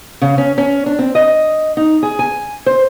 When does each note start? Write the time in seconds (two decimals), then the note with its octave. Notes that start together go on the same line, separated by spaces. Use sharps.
0.22 C#3
0.38 C#4
0.58 C#4
0.86 D4
0.99 C4
1.15 D#5
1.77 D#4
2.03 G#4
2.19 G#5
2.66 C5